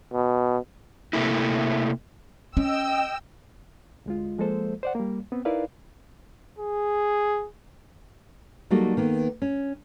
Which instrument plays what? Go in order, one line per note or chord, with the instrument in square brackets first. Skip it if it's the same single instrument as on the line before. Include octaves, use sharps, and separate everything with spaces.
[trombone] B2
[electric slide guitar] C3 A3 A#3 E4
[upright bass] C#4 [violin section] D#5 G5 E6
[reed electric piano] D2 G#3 F4
F3 G#3 A#3 A4 C5
C5 D5 F#5
G3 A#3
B3 C4
D#4 E4 A#4 B4 D5 F5
[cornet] G#4
[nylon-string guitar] F#3 G3 A3 A#3 D#4 F#4
D#3 A#3 B3
C#4